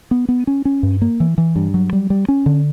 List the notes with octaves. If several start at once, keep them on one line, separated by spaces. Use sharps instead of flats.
B3
B3
C#4
C#4
G2
A#3
E3
E3
G2
F#3
G3
G3
C#4
D3